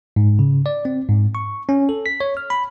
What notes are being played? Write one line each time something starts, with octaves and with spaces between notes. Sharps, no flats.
G#2
C#3
D5
C4
G#2
C#6
C#4
A4
B6
C#5
F6
B5